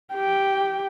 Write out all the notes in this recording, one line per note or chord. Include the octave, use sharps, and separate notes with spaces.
G4 G5